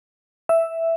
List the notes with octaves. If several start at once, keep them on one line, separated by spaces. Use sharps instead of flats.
E5